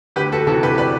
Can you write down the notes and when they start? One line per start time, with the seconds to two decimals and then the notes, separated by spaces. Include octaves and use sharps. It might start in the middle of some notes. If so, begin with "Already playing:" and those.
0.16 D2 G4 B4
0.32 F#4 A4
0.47 C3 E3 F#4 A4
0.63 G4 B4
0.78 B4 D5